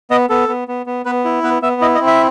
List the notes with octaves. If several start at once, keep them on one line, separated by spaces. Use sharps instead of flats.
B3 D#5
B3 A4
B3
B3
B3
B3 B4
E4
B3 B4
B3 E5
E4 D#5
D#5
C4
E5